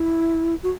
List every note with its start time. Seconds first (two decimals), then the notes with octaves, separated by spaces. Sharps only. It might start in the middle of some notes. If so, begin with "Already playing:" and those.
Already playing: E4
0.63 F#4